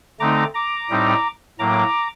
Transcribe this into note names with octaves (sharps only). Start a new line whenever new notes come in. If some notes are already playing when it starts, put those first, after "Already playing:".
D3 A3 C4 D#4 A#5 D6
A#5 D6
A2 G3 C4 D#4
A2 F#3 A#3 A#5 D6